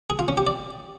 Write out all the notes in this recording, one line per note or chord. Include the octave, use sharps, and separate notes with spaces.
G#4
F4
C#4
G4
D5